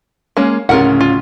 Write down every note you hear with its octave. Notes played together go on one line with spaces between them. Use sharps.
G#3 A#3 C#4
D1 C#3 F4 A#4 F#5
F4